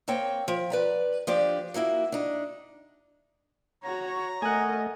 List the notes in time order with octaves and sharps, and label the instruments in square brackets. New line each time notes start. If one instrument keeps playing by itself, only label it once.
[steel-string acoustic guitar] A#3 C4 C#5 G5
F3
B4 D5 A#5
F3 D4 G4 D5
F3 A#3 E4 F#4
D4 D#4
[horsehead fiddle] F#4 C#5 [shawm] A#5
[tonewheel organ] A3 [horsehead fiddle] A#4 D#5 [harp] F#5 G#5